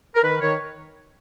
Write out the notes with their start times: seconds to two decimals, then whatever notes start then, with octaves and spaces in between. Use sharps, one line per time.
0.14 A#4
0.22 D#3 B4
0.40 D#3 C#5